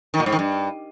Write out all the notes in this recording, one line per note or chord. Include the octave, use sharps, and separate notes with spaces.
D#3
A#2
G#2
D#3
G2